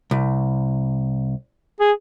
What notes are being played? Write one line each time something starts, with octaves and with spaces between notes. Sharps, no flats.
C2
G#4